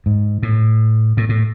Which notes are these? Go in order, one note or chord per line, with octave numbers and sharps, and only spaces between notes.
G#2
A2
A2
A2